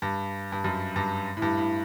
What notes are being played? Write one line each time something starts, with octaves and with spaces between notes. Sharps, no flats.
G2
G2
F#2
G2
A2
G2
A2